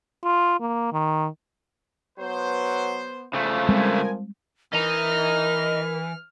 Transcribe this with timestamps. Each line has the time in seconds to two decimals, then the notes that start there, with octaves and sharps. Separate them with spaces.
0.24 F4
0.60 A#3
0.93 D#3
2.19 F#3 B3 B4 C5
3.34 C#3 F3 A3
3.69 C2 G3 G#3 C4 A#4 G#5
4.73 E3 A#4 D#5 A#5 F6